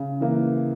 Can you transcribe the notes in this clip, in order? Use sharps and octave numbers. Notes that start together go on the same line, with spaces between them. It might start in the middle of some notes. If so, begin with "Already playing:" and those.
Already playing: C#3
E3 A#3